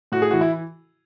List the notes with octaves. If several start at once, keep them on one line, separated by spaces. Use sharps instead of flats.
A2 F#4
G#4
E3 F#4
E4